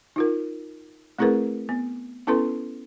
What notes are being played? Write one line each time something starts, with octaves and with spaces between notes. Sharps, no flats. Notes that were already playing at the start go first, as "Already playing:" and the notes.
D#4 F4 A#4
A3 C4 E4 G#4 A#4 B4
B3
B3 C#4 E4 A4 B4 C6